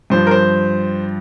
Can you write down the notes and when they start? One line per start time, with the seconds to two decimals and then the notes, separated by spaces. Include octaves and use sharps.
0.10 G2 F3 C5
0.27 A#4
0.31 C5